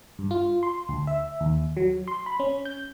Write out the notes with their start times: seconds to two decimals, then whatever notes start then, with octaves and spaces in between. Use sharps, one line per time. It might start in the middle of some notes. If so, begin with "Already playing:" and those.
0.19 G2
0.31 F4
0.63 C6
0.89 D2
1.07 E5
1.41 D#2
1.77 F#3
2.08 C6
2.26 B5
2.40 C#4
2.65 G6